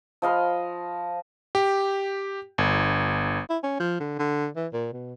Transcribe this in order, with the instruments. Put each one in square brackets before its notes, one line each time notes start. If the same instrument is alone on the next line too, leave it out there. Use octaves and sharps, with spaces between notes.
[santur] F3 D#5 F5 B5
[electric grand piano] G4
G1
[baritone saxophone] E4
C#4
F3
D3
D3
E3
A#2
B2